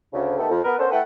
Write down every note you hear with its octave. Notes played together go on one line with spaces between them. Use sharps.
D2 C#3
D#3 A3 B3 G4 A4
F2
B3 A#4 B4
B3 C#4 D4 A4 A#4 C5
A3 E4 A4 B4 F#5 G5